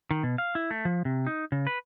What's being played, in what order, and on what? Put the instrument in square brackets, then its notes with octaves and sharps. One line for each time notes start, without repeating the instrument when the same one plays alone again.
[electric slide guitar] D#3
B2
F5
E4
A3
F3
C3
D#4
C#3
B4